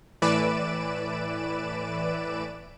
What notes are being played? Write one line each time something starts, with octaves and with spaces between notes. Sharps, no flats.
A2 E3 B4 D5 D7 E7